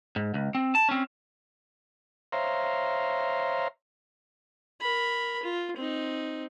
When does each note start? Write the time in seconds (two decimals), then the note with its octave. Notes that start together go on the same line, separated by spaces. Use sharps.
0.16 G#2
0.34 C#2
0.55 C4
0.75 A5
0.89 C4 C#4
2.32 C5 C#5 E5 F5 A#5 C6
4.81 A#4 B5
5.43 F4
5.77 C4 D#4